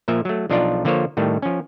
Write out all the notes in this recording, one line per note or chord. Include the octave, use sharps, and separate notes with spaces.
A#2 F3 A#3 E5
F#3 A3
B1 F3 D4 D#4 F4 D5
D3 F3 A#3 F4 C5 C#5
A2 D#3 G3 A3
F3 C#4